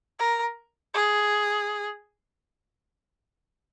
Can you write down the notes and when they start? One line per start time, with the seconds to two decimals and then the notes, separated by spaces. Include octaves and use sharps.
0.19 A#4
0.94 G#4